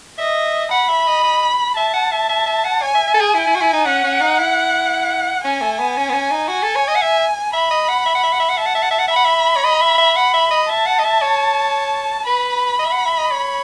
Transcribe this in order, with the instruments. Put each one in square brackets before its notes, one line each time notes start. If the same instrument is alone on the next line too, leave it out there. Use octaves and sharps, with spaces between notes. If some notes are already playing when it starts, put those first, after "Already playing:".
[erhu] D#5 [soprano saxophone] E5
[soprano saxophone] F#5 [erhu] B5
[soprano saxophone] E5
D#5
D#5
[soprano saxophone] E5 [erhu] A5
[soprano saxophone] F#5
E5
E5
E5
F#5
[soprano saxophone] C#5 [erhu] G#5
[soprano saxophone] E5
E5
A4
G#4
E4
E4
F#4
E4
D#4
[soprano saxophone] C#4 [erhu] F#5
[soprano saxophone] C#4
D#4
E4
[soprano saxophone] C#4 [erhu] G#5
[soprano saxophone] A3
B3
C#4
B3
C#4
D#4
[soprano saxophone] F#4 [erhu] G#5
[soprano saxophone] A4
C#5
D#5
F#5
E5
[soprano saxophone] E5 [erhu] B5
[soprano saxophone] D#5
F#5
E5
F#5
E5
F#5
E5
F#5
[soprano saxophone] E5 [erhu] A5
[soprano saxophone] F#5
E5
F#5
E5
F#5
[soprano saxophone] E5 [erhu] B5
[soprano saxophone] F#5
E5
C#5
D#5
E5
E5
[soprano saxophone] F#5 [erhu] B5
[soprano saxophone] E5
D#5
[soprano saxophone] E5 [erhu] A5
[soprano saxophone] F#5
D#5
E5
C#5
[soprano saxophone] B4 [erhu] B5
[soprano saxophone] D#5
E5
F#5
E5
D#5
C#5